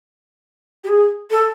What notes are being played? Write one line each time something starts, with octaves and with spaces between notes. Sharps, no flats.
G4
G#4
A4